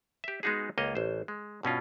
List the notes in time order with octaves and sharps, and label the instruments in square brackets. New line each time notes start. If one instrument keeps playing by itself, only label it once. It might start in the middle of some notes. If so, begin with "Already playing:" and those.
[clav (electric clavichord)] G4 E5
G#3 B3 D#4 F#4 G#4
C#2 A#3 C#5 D#5
A1 C5
G#3
G2 B2 C#4 F4